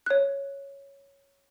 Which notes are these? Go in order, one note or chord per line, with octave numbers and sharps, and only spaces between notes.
C#5 F#6